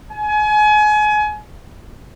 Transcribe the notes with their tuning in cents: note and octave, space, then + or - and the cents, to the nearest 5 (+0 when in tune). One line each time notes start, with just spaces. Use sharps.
G#5 +30